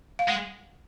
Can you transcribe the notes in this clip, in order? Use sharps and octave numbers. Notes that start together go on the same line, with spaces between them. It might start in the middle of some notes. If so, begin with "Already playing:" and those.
F5
G#3 F#5